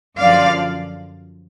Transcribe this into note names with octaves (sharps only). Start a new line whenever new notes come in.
F#2 D3 F3 D5 F5